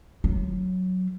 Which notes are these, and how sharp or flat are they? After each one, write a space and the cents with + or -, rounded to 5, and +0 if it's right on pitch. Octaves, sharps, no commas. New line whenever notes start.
F#3 +0 F4 -35